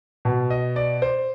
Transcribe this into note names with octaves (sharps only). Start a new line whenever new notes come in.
B2
D#5
D5
C5